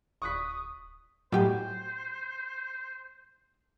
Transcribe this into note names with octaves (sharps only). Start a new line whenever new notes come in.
D1 C#6 D#6 F#6 B6
A2 F#3 F#4 G4 C5 G#5